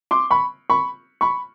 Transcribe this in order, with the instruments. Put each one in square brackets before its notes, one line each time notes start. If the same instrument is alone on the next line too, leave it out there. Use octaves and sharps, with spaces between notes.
[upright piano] C6 D6
B5 C#6
B5 C#6
B5 C#6